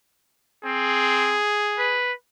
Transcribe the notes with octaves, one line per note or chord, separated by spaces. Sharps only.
C4 G#4
B4